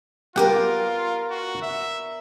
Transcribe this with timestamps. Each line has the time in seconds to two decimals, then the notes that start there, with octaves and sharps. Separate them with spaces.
0.36 B3 F4 G4 A#4 D5 F#5
1.30 F#4
1.62 E5